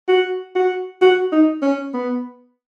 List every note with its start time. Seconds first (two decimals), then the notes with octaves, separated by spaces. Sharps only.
0.08 F#4
0.55 F#4
1.02 F#4
1.32 D#4
1.62 C#4
1.94 B3